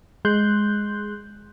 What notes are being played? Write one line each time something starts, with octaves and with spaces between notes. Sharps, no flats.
G#3 C6 F#6 G6